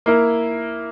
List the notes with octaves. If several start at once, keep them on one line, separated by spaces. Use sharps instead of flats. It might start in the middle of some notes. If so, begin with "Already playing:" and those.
A#3 E4 A#4